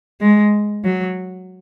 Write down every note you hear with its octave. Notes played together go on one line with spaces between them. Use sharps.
G#3
F#3